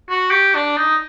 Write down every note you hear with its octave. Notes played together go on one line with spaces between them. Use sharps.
F#4
G4
D4
D#4